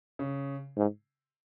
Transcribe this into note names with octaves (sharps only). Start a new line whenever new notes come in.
C#3
G#2